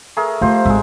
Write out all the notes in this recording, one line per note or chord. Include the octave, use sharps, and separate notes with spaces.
A3 G#4 A#4
F3 A3 G4 C5
G#1 G#3 E5